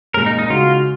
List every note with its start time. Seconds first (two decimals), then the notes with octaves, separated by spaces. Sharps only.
0.14 A#2 G#3 C#4 A#4
0.26 D#4
0.39 D#4
0.50 C#3 G#3 D#4 F4 F#4